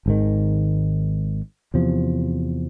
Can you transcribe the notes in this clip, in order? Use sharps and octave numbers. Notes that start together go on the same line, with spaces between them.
G#1 G#2 D#3
E2 C3 F3